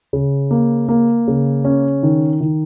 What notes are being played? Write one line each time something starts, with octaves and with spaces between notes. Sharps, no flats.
C#3
A#3
A#3
C#3
C#4
D#3
D#3